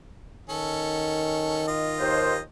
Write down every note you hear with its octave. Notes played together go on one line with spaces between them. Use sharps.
D#3 C#4 A4
F4 D#5
D#2 C5